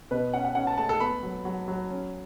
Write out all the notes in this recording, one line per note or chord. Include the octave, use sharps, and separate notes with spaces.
B2 B4
C#4 F#5
F#5
C#4 F#5
A5
A3 A5
A4
B3 B5
F#3
F#3
F#3
C#4